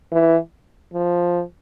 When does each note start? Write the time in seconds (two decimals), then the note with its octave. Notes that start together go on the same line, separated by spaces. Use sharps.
0.12 E3
0.94 F3